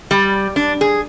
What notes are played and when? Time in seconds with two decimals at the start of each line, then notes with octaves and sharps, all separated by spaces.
0.11 G3
0.56 D4
0.81 G#4